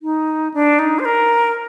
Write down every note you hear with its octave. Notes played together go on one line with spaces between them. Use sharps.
D#4
D4
D#4
C5
A#4